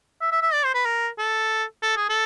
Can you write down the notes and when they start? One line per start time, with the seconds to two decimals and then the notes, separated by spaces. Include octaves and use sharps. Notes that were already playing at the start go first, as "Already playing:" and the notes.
0.21 E5
0.32 E5
0.42 E5
0.54 D5
0.64 C5
0.75 B4
0.85 A#4
1.19 A4
1.83 A4
1.97 G#4
2.09 A4